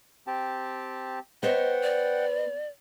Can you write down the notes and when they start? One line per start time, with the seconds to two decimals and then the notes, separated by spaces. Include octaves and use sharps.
0.27 C4 G4 A5
1.43 B3 C5 C#5 D#5 F#5 G5
1.83 D5